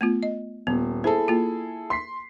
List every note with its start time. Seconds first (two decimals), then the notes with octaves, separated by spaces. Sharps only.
0.01 A3 B3 F4
0.23 D#5
0.67 D#1 B3
1.04 E4 G#4 A4 C5 B5
1.28 A#3 F4
1.90 C6 B6 C7